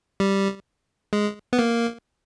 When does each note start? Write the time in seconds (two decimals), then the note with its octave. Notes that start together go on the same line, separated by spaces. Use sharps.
0.20 G3
1.13 G#3
1.53 B3
1.59 A#3